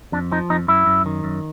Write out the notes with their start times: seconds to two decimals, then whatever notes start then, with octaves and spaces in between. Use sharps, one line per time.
0.12 F2 D4
0.32 F3 D#4
0.50 F2 D#4
0.68 F#2 E4
0.87 F#2
1.06 D#3
1.24 F#2